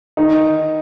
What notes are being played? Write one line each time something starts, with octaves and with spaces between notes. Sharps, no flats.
D#3 D#4